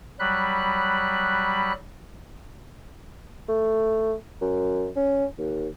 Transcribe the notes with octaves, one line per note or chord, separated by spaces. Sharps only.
F#3 G3 B5 F#6
A3
F#2
C#4
D#2